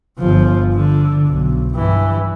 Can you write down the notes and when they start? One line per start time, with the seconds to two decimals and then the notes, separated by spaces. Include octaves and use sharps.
0.19 G1 F3
0.73 D3
1.27 B1
1.75 G2 E3